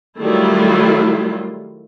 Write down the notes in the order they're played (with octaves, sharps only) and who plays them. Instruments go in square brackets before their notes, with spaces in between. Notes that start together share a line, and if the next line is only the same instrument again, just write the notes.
[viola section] D#3 F#3 G3 A3 E4 F4